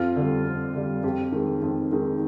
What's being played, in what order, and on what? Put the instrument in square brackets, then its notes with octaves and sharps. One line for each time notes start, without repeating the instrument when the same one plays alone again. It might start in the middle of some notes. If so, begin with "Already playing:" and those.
Already playing: [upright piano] F2 F4
D3 G3
F2
D3 G3
F2 G4
D#3 G#3
F2
D#3 G#3